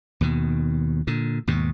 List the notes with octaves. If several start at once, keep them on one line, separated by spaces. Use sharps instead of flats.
D#2 B2 D#3
A#2 D3
D#2 G#2 B2